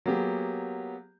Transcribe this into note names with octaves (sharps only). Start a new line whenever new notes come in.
F#3 A#3 B3 G4 G#4